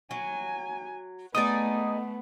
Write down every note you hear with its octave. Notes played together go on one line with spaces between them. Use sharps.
F#3 G#5
A3 B3 D#4 G#4 D5 D#6